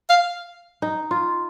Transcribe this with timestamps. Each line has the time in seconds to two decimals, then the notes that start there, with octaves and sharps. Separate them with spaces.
0.10 F5
0.82 D#4
1.11 F4